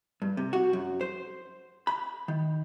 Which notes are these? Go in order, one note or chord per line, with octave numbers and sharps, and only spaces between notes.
G2
C3
F#4
F#2
C5
B5
D#3